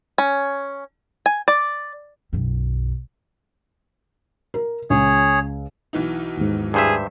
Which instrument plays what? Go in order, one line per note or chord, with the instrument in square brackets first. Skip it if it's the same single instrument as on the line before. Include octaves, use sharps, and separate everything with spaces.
[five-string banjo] C#4
G#5
D5
[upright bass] B1 F#2
[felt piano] A#4
[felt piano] C#2 [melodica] G#4 C#5
[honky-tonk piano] B1 E3 D#4
[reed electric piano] D#2 G#2
[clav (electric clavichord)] G2 C5 E5 [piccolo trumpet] G#4